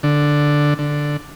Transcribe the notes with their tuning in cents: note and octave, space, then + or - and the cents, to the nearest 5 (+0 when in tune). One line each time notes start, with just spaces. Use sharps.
D3 +0
D3 +0